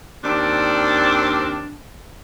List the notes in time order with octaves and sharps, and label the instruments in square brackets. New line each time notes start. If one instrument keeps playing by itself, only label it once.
[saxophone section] D#2 C4 D4